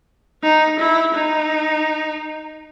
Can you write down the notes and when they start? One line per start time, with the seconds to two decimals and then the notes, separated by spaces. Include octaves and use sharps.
0.43 D#4
0.79 E4
1.14 D#4